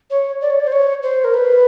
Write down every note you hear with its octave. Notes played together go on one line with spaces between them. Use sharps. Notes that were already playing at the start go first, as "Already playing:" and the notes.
C#5
D5
C#5
D5
C5
C#5
C5
A#4
B4